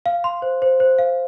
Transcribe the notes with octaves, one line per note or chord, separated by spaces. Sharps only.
F5
C6
C5
C5
C5
F5